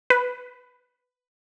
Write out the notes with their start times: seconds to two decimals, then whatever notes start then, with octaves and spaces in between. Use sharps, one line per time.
0.10 B4